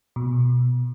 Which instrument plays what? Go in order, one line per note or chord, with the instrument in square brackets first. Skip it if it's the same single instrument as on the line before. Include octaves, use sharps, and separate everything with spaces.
[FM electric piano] B2